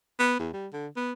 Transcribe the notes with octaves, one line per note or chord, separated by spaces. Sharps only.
B3
E2
G3
D3
B3